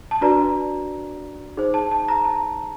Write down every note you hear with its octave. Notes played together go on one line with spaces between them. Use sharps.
A5
D4 F#4 B4 D5 A#5
D#4 G#4 C5
A5
A5
A#5
A5